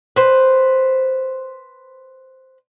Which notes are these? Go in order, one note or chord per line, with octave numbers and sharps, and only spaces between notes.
B4 C5